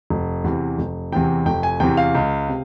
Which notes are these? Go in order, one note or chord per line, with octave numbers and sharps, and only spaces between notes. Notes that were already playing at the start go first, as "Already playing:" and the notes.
F1
E2 C3 E3
F1
E2 C3 E3 G5
F1 G5
G#5
E2 C3 E3 G5
F5
C#2
C3